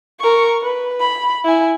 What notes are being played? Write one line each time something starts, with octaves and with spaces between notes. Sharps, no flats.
A#4 C#6
B4
B5
E4 G#5